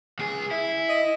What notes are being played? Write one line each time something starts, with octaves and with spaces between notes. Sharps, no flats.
C#2 G#4
E4
D#5